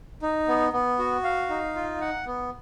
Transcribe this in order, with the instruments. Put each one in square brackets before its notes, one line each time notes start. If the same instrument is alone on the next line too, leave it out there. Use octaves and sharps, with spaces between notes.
[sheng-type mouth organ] D#4
B3
B3
F#4
F5
D#4
F4
F#5
B3